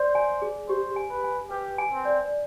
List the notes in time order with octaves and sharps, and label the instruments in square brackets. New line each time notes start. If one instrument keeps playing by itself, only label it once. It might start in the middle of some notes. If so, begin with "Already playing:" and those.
Already playing: [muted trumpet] C5 [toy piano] D5
[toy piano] G#5
G#4
[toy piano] G4 [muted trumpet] C5
[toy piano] G#5
[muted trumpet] B4
[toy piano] G#5
[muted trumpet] G4 [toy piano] B4
[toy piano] G#5
[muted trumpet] C4
[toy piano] D5